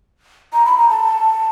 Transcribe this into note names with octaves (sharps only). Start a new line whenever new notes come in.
A#5
B5
A#5
A5